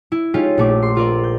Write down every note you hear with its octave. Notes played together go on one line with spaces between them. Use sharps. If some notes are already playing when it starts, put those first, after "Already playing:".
E4
G#3 C#4 D#4 F4 G4
A#1 A3 D6
C6
C4 F4 A#4 D5
G6